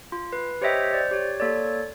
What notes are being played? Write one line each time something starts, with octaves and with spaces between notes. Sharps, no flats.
F4
B4
G4 C5 C#5 D#5 E5 G5
C5 D5
G4 C#5
A#3 A4 C#5 D5